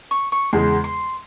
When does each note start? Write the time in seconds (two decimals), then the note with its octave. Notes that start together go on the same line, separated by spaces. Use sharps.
0.11 C#6
0.32 C#6
0.53 E2 C#3 G#3 C6
0.84 C6